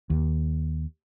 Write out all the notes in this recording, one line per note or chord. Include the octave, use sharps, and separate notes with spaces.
D#2